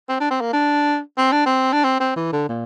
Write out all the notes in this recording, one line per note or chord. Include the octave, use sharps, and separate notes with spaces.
C4
D4
C4
A#3
D4
C4
D4
C4
D4
C4
C4
E3
D3
A#2